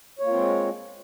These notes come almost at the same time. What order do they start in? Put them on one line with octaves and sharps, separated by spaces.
C#5 A#3 F4 C4 G#3